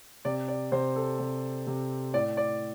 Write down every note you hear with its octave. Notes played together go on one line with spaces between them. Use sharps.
C3 D5
D5
C3 C5
A4
C3
C3
A2 D5
D5